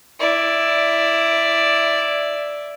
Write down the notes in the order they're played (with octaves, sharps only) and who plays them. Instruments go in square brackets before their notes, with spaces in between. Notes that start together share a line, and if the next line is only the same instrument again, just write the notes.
[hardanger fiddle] E4 D5